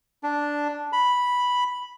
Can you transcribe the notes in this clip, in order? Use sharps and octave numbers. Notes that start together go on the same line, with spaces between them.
D4
B5